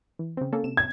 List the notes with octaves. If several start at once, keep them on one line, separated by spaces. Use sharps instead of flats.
E3
C#3 C4
A#3 C#4 A4
C3 E7
G#6